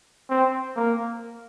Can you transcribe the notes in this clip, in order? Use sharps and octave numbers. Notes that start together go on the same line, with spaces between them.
C4
A#3